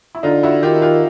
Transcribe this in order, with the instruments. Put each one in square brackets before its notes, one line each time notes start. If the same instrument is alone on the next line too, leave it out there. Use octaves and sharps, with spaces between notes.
[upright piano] E4
[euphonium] D3 [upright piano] D#4 F4
[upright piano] E4 F#4
[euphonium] D#3 [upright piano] F4 G4
[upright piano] F4 G4